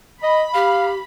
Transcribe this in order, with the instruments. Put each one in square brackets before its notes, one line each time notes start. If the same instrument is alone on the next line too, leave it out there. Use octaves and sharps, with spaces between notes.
[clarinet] D#5 [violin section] B5
[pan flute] G4 [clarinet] F5